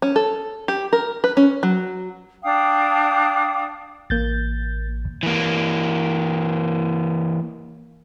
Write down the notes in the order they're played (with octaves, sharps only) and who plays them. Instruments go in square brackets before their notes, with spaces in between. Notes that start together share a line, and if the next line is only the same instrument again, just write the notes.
[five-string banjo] C#4
A4
G4
A#4
B4
C#4
F#3
[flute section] D4 F5 G5 D#6
[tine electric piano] A1 [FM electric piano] A#3 G6 A6
[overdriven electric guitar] E3 A#3